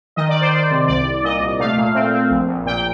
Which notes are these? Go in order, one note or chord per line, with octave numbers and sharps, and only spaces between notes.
D#3 D#5
D5
D#3
C5
D#3 D5
C3
C2 D5
C2
A#2 D#5
C2
A3 F5
A#2
C4
C4
A#1
A#1
A#2 G5